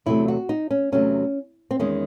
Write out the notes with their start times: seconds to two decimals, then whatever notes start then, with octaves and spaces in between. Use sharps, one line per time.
0.06 E2 C3 F#3 A3 E4
0.28 F#4
0.49 D#4
0.71 C#4
0.92 E2 C3 F#3 A3 C#4
1.71 C4
1.79 E2 D#3 G#3 C#4